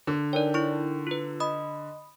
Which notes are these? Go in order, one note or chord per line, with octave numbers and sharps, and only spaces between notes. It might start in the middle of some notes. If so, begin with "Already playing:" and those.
D3
D#4 A#4 C#5 D5 G5
E4 C#6 G6
F4 B4
D#5 B5 D#6